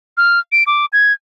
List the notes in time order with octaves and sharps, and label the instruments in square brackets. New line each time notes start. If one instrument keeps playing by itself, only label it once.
[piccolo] F6
D7
D6
G#6